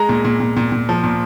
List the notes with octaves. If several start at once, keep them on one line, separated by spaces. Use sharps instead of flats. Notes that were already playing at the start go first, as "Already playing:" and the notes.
Already playing: G#3 A#5
A#2
A#2
A#2
A#2
A#2
F3
A#2